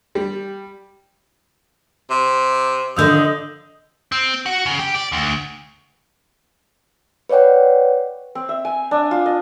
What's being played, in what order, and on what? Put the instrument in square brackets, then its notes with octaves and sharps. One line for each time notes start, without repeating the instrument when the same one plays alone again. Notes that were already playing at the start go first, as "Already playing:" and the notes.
[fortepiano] G3
[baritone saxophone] C3
[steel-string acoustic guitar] D3 D#3 F3 [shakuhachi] D#5 [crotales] D#6 E6 G6
[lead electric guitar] C4
F#4
C#3
G4
D5
D2
[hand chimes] B4 C#5 D5 F#5 G5
[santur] C4
E5
G#5
D4
F4
D#5